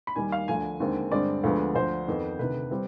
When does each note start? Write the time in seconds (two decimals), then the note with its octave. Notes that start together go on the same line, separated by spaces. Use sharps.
0.07 B5
0.16 D#2 D#3 G3 G#5
0.32 F5
0.48 D2 D3 F3 G#5
0.80 D#2 D3 G#3 C4
1.11 G2 D3 G#3 C4 D5
1.43 D2 D3 F3 G#3 B3
1.75 D2 D3 F3 C5
2.08 F2 D#3 B3
2.39 D2 C3 D#3 B4
2.71 G3 C4